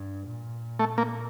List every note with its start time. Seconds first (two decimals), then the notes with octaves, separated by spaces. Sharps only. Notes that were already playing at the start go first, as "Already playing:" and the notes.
Already playing: G2
0.27 A#2
0.79 A3
0.98 A#3